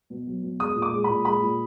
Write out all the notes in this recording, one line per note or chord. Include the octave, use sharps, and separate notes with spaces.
B2
F#3
B2
G#3 D#6
A#2
D6
G#3
A#2 B5
G#3 B5
A#2